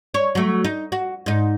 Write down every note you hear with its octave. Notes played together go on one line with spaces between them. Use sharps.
C#5
F#3 A3
D#4
F#4
G#2 D#4